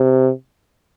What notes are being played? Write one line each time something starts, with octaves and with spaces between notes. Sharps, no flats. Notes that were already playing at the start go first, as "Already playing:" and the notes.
Already playing: C3